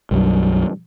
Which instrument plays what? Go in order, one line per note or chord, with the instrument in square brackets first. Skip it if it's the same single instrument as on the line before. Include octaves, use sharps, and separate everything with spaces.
[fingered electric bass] B1 F#2 F#3 G3